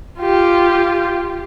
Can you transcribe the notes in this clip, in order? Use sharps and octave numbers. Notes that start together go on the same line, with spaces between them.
F4 G4